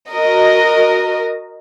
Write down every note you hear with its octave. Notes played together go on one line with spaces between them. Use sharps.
F#4 A#4 D#5